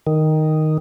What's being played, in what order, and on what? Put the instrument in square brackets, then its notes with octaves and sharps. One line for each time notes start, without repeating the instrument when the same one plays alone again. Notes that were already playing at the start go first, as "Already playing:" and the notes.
[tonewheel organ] D#3